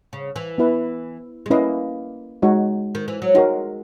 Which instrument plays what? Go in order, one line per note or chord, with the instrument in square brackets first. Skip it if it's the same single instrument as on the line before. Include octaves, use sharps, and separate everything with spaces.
[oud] C#3
E3
[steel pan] B3 E4 B4 E5
[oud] G#3
[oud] A#3 [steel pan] C#4 E4 B4 D#5
[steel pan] G#3 D#4 F#4 C#5
[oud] D#3
E3
F#3
[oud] G#3 [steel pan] D#4 F#4 A#4